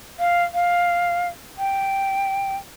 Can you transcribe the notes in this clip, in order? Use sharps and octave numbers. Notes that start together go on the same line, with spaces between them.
F5
F5
G5